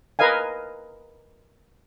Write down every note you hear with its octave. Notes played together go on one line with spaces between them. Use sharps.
A#4 B4 D#5 F5 G#5